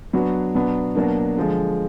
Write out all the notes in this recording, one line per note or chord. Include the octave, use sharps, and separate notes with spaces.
F#3 B3 D4 F#4
B2 F#3 B3 D4
B2 F#3 A#3 D4
D3 F3 G#3